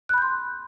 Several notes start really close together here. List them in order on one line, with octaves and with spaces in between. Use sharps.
F#6 B5 G6 C6